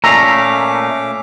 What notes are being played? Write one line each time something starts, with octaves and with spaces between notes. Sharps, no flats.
A#2 A3 C#4 A#5 D6 E6 B6 C7